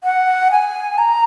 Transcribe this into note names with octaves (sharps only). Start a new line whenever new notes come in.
F#5
G#5
A#5